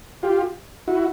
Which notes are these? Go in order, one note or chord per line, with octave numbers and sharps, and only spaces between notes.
F4 G4
E4 F#4